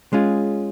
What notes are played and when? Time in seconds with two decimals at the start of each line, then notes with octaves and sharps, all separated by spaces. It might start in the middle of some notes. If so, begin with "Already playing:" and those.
0.13 G#3 C#4 F4 G#4